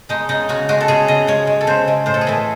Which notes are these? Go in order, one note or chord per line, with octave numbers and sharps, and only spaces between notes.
G#3 D#4
C#3 D#4
C#3 F#4
G#3 F#4
A4
C#3 G#4
C#3 D#5
G#3 C#5
G#3
A4
C#3 C5
G#3
A2 C5
A4
G#4
E3 A4